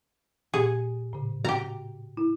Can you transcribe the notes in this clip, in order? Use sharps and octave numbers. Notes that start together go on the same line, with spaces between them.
A#2 G4 G#4
A2 C#3
F#4 G4 A#5
E4